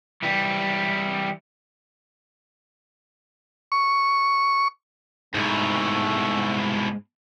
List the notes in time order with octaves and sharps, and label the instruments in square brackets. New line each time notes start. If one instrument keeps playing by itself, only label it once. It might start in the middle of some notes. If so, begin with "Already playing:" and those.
[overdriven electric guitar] E3 G3
[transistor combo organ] C#6
[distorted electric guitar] C2 B2 [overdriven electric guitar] G#2 [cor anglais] A3